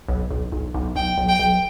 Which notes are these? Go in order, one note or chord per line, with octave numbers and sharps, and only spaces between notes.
B1
B1
B1
B1
B1 G5
B1
G5
B1